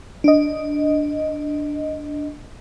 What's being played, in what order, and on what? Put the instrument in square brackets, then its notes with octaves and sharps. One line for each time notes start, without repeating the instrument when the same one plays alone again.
[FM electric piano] D4 D#5